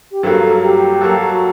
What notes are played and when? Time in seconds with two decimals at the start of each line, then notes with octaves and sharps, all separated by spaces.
0.11 G4
0.23 G2 F#3 A#3 F#4 A4
0.42 A4
0.62 G4
1.01 F#3 A#3 F#4 A4
1.29 F#4